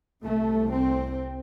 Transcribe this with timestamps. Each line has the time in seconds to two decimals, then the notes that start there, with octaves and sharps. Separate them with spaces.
0.24 C2 C3 A3
0.72 C4